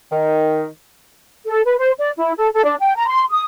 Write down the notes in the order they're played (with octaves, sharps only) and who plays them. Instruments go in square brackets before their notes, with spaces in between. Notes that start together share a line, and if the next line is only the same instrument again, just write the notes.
[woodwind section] D#3
[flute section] A4
B4
C5
D5
E4
A4
A4
D4
G5
A#5
C6
D#6